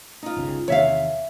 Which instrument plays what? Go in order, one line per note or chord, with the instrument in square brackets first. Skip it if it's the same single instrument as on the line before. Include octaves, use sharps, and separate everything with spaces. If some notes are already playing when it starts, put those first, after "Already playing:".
[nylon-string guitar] D#4 F4
[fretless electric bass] G1 C#2 C#3
[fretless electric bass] E2 C3 D#3 [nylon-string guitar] C#5 E5 F5